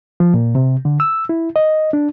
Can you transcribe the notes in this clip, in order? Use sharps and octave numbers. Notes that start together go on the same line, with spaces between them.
F3
A#2
C3
D3
E6
E4
D#5
D4